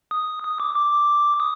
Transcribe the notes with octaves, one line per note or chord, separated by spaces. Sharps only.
D#6
D#6
D6
D6
D#6